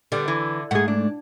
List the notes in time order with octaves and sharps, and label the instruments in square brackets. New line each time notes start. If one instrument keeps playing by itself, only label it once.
[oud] D3 [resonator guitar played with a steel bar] G3 B3
[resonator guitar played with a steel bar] E3
[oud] G#2 A3 [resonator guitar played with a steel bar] G#4 F#5
[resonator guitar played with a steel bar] D4